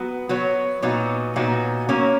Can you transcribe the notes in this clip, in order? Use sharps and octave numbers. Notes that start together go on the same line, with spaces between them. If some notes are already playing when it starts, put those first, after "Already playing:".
Already playing: F#3 B3 F#4
F#3 B3 F#4 C#5
A#2 F#3 B3 D#4 F#4
A#2 F#3 B3 D#4 F#4
F#3 A#3 C#4